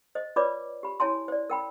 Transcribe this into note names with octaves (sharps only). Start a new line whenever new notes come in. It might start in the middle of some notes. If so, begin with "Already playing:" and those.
C5 D#5
F4 B4 C#5 D5 B5 D6
G4 B5
E4 C#5 G#5 A5 C6
C5 D5
A#4 G5 B5